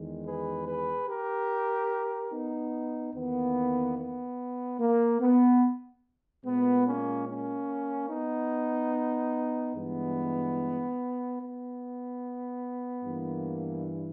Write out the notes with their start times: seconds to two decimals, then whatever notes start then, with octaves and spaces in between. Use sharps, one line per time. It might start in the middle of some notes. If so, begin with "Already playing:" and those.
Already playing: E2 D#3 G#3
0.25 G#4 B4
0.67 G#4 B4
1.08 G4 A#4
2.32 B3 D#4
3.15 E2 D#3 A#3 B3
3.97 B3
4.80 A#3
5.21 B3
6.45 A#2 G#3 B3
6.86 A#3 C#4
7.27 A#3 C#4
8.10 B3 D#4
9.75 G2 E3 G#3 B3
11.41 B3
13.05 G2 E3 A#3